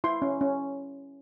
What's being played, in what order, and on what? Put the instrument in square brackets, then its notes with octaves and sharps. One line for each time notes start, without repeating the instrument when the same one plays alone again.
[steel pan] E4 C6
C#4
C#4